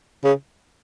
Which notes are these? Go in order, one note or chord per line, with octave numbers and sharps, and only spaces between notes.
C#3